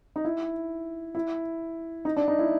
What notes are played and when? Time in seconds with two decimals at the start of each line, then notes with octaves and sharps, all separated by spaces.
0.16 D#4
0.25 E4
1.15 E4
2.05 D#4
2.16 D4
2.28 D#4
2.39 E4